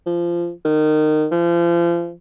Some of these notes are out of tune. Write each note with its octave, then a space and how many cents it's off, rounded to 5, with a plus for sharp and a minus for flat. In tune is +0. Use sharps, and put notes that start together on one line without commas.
F3 -20
D#3 -20
F3 -35